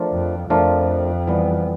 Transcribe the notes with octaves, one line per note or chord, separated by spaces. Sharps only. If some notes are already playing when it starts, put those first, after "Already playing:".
Already playing: F3 A3 D4 F4 A#4
F2
F2 F3 A3 D4 F4 A#4
E3 G3 B3